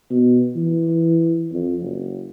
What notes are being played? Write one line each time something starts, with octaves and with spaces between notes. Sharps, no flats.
B2
E3
F2
F#1